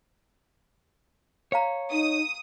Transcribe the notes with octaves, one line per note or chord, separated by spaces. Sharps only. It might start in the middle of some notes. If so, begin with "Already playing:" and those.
C#5 D5 F5 A#5
D#4 D#6